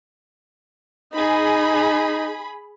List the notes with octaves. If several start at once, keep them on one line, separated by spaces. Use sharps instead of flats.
D#4 G#4 B5